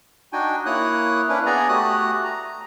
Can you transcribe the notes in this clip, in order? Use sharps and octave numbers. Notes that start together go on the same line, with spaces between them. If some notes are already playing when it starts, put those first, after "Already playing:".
D4 D#4 F#4 G5 G#5
A#3 E4 C#5 D#6 F#6
C#4 D4 E4 B4
B3 G#4 D5 G#5 A#5
A3 F#4 G4 D#6 F#6
A#5